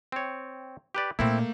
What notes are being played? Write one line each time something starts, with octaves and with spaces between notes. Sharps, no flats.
C4 C#5
G4 B4 D5
A#2 A3 A#3 C4 E4